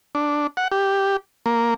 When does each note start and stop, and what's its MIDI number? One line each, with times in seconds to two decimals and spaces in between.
0.15 0.47 62
0.57 0.68 78
0.72 1.17 67
1.46 1.74 58